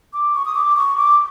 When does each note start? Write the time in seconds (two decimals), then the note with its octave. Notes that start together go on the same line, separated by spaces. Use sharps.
0.13 D6
0.34 C#6
0.45 D#6
0.55 D6
0.76 C#6
0.97 D6